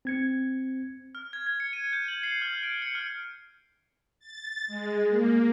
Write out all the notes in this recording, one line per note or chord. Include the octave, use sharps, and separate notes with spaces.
C4 G#6 C#7
F6
G#6
G#6
C#7
D#7
G6
F#7
C7
F6
D7
C#7
F6
A6
G#3
A#3